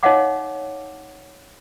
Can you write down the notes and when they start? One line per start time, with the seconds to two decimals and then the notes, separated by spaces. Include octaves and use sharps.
0.03 D#4 C#5 D#5 F5 F#5 D6